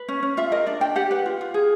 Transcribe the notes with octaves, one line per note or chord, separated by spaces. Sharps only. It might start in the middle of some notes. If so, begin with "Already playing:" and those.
Already playing: B4
C#4
C#4
F4 E5
A#4 D#5
D4 D5
D4 G5
G4 F#5
B4 F#5
F4
F4
G#4